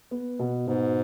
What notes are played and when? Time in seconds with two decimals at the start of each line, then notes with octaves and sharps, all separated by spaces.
0.11 B3
0.39 B2
0.67 G#2 B2